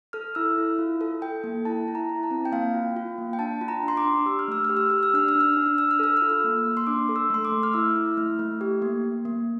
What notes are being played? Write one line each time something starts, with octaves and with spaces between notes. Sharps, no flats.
A4 F6
E4 E6
E4
F4
A4
A4 G5
A#3
E4 A5
E4
A#5
E4
A5
C4
G5
A#3 F5
F4
F4
A#3
G5
D4 A5
F4
A#5
D4
C6
D6
D4
G4 E6
F6
A3 E6
F6
G4
E6
G4 F6
E6
D4 F6
E6
D4
F6
D4 E6
F6
D4 E6
F6
A4 E6
F4 F6
E6
A#3
A#3
C6
D4 D6
A4
E6
A3 C6
D6
A3
F6
E4 E6
E4
A3 F6
A3
G4
A#3
A#3
A#3